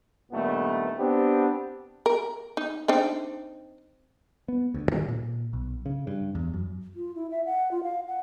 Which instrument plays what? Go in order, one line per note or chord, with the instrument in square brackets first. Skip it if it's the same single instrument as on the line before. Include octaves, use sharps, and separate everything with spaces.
[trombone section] G2 A#2 D#3 A3 B3
B3 C4 D4 G4
[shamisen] A#4
D#4
C4 D4 D#4
[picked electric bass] B3
D2
D#3
A#2
B1
C#3
G2
E2
F#2
[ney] F4
E4
E5
F#5
F4
F5
F#5